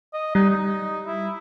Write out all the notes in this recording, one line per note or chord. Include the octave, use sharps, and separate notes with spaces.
D#5
G3 D#4
D#4
E4